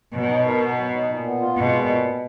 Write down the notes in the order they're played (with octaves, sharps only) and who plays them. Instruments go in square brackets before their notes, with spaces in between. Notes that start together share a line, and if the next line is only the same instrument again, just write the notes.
[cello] B2 [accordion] F#3
[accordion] D#4
A#4
B3
F#3
D#4
A#2
B3
F4
[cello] B2 [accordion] G#3
[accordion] A#2